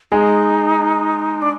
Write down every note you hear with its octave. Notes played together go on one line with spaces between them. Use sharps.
G#3 D#4 G#4
D4